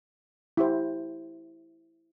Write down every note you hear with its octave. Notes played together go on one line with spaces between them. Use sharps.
E4 G4 C5